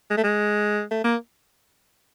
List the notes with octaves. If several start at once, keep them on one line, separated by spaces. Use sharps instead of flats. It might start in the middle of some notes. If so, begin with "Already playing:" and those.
G#3
A3
G#3
A3
A#3